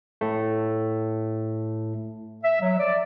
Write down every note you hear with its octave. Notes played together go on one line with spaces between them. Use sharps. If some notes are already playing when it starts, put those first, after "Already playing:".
A2 A3
E5
F#3
D5